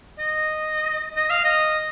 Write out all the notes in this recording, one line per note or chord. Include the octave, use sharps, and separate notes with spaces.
D#5
D#5
F5
D#5